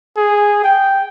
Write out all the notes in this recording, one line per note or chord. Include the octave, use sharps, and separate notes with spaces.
G#4
G5